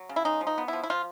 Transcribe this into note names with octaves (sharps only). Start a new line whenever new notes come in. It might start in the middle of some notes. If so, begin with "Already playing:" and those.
Already playing: F#3
C#3
E4
G#3 D#4
F3
D#4
B3
F3 E4
E4
F3 F4